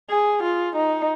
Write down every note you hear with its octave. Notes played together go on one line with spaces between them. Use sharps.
G#4
F4
D#4